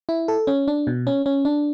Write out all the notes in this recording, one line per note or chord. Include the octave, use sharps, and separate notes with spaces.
E4
A4
C#4
D4
B2
C#4
C#4
D4